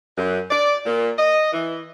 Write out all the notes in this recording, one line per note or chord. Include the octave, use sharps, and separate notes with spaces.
F#2
D5
A#2
D#5
E3